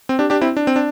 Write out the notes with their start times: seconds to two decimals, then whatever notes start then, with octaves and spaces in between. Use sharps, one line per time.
0.09 C4
0.19 D4 G4
0.30 D4 G4
0.41 C4 E4
0.57 D4
0.67 C4
0.76 D4